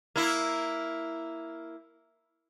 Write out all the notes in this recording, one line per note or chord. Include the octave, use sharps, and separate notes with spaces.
A#3 E4